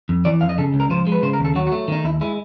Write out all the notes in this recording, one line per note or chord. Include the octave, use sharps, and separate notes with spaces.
F2
E3 D5
F2 F5
D#5
C#3 A4
C#2
A#4
F3 C5
G#3
B4
C#3 C5
A#4
D#2
A4
F#3 F#4
F#4
A3
D#3 D#4
D#2 E4
G#3 E4